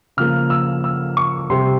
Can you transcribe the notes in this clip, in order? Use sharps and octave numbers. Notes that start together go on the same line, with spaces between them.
C#3 F3 A#3 F6
E6
E6
C#6
C3 G3 C4 C6